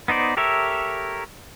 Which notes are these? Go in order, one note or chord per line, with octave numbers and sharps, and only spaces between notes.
B3 D#4 C5 D5
G4 A4 A#4 C#5 E5